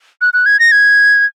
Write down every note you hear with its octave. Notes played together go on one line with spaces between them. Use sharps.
F#6
F#6
G#6
A#6
G#6